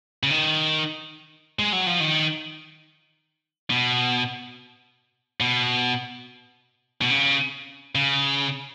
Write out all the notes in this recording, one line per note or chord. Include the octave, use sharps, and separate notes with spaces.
C#3
D#3
G#3
F#3
F3
D#3
B2
B2
B2
C#3
C#3